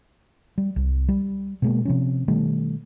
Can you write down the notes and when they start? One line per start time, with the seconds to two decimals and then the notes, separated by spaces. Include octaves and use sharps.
0.58 G3
0.76 C2
1.08 G3
1.62 B2 G#3 A#3
1.85 C3 F3 C#4
2.28 B2 D#3 G3 A3